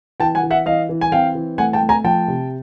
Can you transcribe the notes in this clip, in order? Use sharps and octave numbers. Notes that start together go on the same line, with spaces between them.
E3 G5 A5
F#5 G#5
E3
E5 F#5
E3 D#5 F5
E3
G#5
C4 F5 G5
E3
A3 F#5 G#5
G5 A5
A3
G#5 A#5
F3 G5 A5
C3